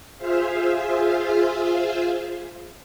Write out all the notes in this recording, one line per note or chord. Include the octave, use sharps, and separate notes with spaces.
F4 G#4 C5 E5 F5